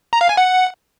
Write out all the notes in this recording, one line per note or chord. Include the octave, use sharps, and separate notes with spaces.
A#5
F5
G#5
F#5